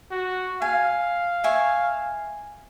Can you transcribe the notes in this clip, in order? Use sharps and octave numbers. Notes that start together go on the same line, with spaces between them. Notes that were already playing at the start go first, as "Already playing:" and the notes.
F#4
F5 G#5
E5 G#5 C#6